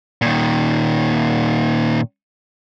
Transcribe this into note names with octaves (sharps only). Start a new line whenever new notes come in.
A#2 D#3